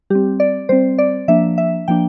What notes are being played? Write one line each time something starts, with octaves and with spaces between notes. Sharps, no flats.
G3 C4 G4
D5
G3 C4 C5
D5
F3 A#3 D4 E5
E5
F3 A#3 D4 G5